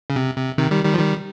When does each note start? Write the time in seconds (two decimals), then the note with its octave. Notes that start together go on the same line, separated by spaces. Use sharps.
0.10 C#3
0.16 C3
0.36 C3
0.57 C3 D#3
0.71 D#3 G3
0.85 D#3 G3
0.94 F3
0.99 D#3 G3